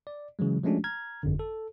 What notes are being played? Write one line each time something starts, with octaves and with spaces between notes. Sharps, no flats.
D5
C#3 E3 F#3 G#3
F3 G#3 A3 C#4 D4 F#4
A#5 F6 G#6
G1 F2 D3
A4